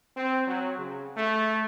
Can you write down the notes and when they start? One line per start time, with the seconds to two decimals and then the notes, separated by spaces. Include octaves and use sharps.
0.17 C4
0.47 F#3
0.78 C#3
1.17 A3